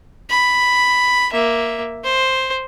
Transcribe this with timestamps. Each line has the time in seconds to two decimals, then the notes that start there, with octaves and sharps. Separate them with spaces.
0.30 B5
1.33 A#3 E5
2.04 C5